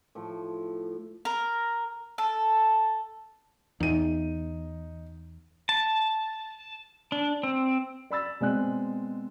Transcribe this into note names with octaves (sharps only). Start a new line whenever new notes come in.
A2 F3
A#4
A4
E2 D#4 D#7
A5
D4
C4
D5 B5 E6 A6
B2 G#3 C4 D5 G#5 F#6